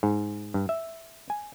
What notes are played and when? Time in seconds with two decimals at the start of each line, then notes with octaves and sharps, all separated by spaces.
0.03 G#2
0.54 G2
0.69 E5
1.30 G#5